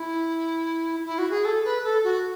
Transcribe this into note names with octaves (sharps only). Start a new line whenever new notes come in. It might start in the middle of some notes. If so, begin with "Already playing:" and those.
Already playing: E4
E4
F#4
G#4
A4
B4
A4
F#4